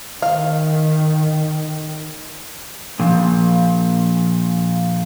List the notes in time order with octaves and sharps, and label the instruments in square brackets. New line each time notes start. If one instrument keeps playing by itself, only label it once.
[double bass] D#3 [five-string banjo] F5
[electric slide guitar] A#2 F3